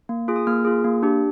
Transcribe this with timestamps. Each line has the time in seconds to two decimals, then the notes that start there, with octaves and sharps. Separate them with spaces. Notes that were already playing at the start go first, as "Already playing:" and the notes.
0.09 A#3
0.28 F4 G#4
0.36 D#6
0.47 A#3 F6
0.65 F4 G#4
0.85 A#3
1.02 D4 G4